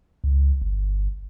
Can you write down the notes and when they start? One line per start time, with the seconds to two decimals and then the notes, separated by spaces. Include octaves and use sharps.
0.24 C#2
0.62 G1